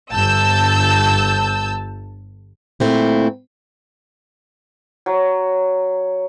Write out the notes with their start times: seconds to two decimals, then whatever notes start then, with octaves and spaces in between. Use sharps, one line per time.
0.12 G1 A5 E6 G6
2.80 A#2 A3 C4 E4
5.06 F#3